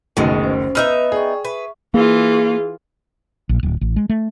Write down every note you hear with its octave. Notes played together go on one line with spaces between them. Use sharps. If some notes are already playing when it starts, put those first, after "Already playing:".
F#1 D2 B2 D#3 G#3
C#4 C5
B3 D#4 B4 E5 E6 F6
G#4 D5 G5 C#6
B4 E5 C#6
E3 A#3 F4 G#4
A#1
D1
A1
G#3
A3